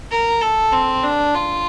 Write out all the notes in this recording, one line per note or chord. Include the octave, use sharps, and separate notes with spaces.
A#4
A4
C4
D4
F4